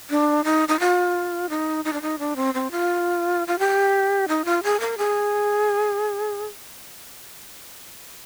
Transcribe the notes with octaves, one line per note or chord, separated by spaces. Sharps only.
D4
D#4
D#4
F4
D#4
D#4
D4
D#4
D4
C4
C4
F4
F4
G4
D#4
F4
G#4
A#4
G#4